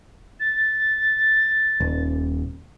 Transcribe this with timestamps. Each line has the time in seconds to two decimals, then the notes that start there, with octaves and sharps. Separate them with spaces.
0.40 A6
1.80 D#1